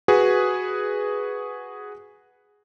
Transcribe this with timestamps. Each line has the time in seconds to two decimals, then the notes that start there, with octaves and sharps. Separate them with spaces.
0.08 F#4 G#4 B4